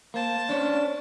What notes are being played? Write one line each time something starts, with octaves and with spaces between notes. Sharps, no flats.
A#3 C5 A5
C#4 D4